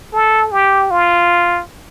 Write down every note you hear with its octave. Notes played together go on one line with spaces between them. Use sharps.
A4
G4
F4